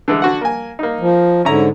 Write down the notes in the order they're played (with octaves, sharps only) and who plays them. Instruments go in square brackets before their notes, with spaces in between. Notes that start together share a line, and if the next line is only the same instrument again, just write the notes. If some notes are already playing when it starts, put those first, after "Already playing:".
[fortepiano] D3 E3 G#3
D3 F#4 F#5
A#3 G#5
A#3 D#4
[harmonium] F3
[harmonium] G#2 D3 [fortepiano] C#4 E4 A#5